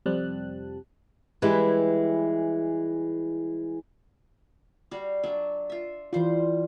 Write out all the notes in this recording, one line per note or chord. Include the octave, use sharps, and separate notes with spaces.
F2 C3 G3 C4 A5 F#6
E3 G3 G#3 E4 G4 B4
G3 F#4 F5
F#3 D4 E5
F4 E5
E3 G3 F4 C5